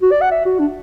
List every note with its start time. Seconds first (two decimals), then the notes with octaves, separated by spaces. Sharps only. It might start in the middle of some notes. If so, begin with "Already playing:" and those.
0.02 F#4
0.12 D5
0.21 F#5
0.31 E5
0.45 F#4
0.59 D4